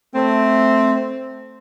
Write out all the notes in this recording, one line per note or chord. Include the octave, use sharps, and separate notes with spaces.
A3 C4